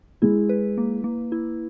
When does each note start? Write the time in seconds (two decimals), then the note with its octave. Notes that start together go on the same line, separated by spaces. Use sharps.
0.22 G#3 E4
0.49 B4
0.77 A#3
1.04 A#3
1.32 E4